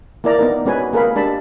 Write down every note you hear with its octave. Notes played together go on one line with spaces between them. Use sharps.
A#3 E4 A#4 D5 A#5
B3 D#4 A#4
G#3 C#4 F#4 B4 G#5
A#3 G#4 A#4 B4 F5 B5
G#3 D4 G4 A5 B5